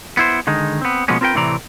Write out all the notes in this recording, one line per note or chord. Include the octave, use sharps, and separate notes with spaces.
B3 E4 C5
D3 D#3 G#3 D#4
B3 C4
B2 F3 G#3 A#3 B3 C#4
C4 F4 A#4 B4 G5
A2 C3 E3 C4 D5 A#5